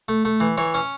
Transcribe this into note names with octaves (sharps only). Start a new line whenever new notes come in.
A3
A3
E3
E3 C#5
C#4